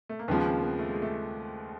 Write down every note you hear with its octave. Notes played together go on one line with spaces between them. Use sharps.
A3
A#3
D#2 C#3 F3 G#3 B3
C4
B3
A3
G#3
A3